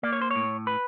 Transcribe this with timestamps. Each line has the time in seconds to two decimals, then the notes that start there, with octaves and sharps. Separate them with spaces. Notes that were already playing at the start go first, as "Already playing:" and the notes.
0.03 A#3 D5
0.13 C#5
0.22 C5
0.31 C#5
0.36 A2
0.67 B4